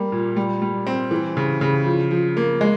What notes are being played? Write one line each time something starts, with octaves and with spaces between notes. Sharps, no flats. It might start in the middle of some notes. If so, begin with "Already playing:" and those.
Already playing: G3 A#3
A#2
G3
G3
C4
E3
C#3
C#3
F3
F3
A#3
G#3